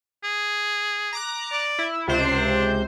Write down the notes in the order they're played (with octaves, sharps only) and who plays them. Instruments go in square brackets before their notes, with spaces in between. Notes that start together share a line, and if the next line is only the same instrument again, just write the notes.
[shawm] G#4
[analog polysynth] A#5 D6 F#6
[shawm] D5
[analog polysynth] E4
[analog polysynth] C#2 C3 C5 [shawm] D4